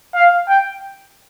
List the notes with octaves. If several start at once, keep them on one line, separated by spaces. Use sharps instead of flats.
F5
G5